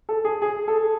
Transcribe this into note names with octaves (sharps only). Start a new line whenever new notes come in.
A4
G#4
G#4
A4